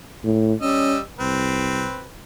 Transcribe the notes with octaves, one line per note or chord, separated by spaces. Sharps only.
A2
G3 C#4 D#5 E6
C2 C4 B4